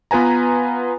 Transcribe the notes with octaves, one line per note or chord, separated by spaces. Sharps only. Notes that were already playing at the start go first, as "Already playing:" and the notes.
B3 F4 B4 G#5 A#5